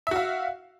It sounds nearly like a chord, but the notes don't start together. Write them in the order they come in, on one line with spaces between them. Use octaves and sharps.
E5 F#4 F5